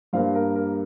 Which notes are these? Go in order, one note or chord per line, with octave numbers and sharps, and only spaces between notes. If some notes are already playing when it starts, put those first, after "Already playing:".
G2 G3 A#3 C5 F5
A#4
A#4